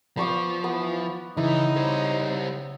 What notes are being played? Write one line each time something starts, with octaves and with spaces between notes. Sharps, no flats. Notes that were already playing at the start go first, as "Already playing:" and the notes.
F3 B3 B5 C#6 D6
E3 B3
C#3 E3 D#4 E4 A6 C#7
G3 C5 C#5